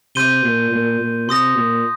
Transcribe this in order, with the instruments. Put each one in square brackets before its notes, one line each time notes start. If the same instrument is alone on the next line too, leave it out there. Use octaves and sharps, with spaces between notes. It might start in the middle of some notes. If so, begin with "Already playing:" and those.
[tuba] C3 [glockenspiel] C6 G6 D#7 G7
[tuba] A#2
A#2
A#2
[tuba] C3 [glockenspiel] C6 D#6 A#6
[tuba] A#2